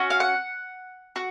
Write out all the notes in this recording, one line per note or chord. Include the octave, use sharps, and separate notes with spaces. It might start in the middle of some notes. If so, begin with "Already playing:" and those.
Already playing: C#4 F#4
F5
F#5
F#4